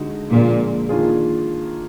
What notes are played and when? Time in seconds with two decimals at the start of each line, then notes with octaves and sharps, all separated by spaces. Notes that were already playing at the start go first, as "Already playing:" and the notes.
Already playing: D3 G#3 D#4 F#4
0.31 A#2 D3 F3 G#3
0.89 D#3 A#3 D4 F4 G#4